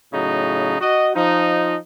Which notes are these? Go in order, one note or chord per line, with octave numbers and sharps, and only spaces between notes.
A2 C#3 F#3 D#4
F#4 D#5
F3 D#4